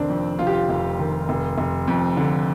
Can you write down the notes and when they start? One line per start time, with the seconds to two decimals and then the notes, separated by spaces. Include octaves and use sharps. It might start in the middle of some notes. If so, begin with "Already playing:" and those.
Already playing: F1 D#3 C4 D4
0.09 F2
0.39 F1 F4
0.47 G4
0.53 F4
0.69 F1
0.99 D#3
1.29 F1
1.58 F1
1.88 F2
2.17 D3